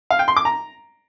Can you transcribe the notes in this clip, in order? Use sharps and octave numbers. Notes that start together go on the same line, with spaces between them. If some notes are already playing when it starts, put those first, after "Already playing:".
F5
G5
C6
D6
A#5